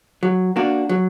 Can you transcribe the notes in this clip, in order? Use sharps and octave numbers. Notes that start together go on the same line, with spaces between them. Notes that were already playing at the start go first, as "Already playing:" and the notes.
F#3
A#3 D4 F#4
F#3